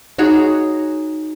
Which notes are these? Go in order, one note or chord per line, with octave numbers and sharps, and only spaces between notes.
D#4 F#4 G#4 C#5